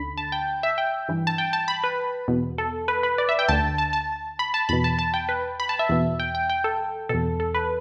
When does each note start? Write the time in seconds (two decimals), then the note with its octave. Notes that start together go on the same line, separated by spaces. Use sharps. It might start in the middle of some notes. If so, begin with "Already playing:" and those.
Already playing: D2 D3 B5
0.18 A5
0.32 G5
0.63 E5
0.78 G5
1.09 G2 E3
1.27 A5
1.38 G5
1.53 A5
1.68 B5
1.84 B4
2.28 E2 B2
2.58 A4
2.88 B4
3.03 B4
3.18 D5
3.29 E5
3.39 G5
3.49 D2 D3 A5
3.78 A5
3.93 A5
4.39 B5
4.54 A5
4.69 E2 B2 B5
4.84 A5
4.99 A5
5.14 G5
5.29 B4
5.60 B5
5.69 A5
5.79 E5
5.89 E2 B2
6.20 G5
6.35 G5
6.50 G5
6.64 A4
7.09 E2 B2 A4
7.40 A4
7.55 B4